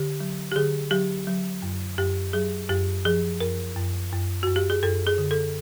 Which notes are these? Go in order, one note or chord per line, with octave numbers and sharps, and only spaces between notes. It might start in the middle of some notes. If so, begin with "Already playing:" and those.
Already playing: D3 G4
F#3
G4
D3 G#4
F#3 G4
F#3
F#2
F#2 G4
F#3 G#4
F#2 G4
F3 G#4
F#2 A#4
F#2
F#2
F#2 F#4
G4
G#4
F#2 A4
G#4
D3
A4